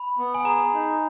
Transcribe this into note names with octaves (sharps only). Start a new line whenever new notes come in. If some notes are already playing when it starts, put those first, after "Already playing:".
Already playing: B5
B3
G#5
G#4 A#5
D#4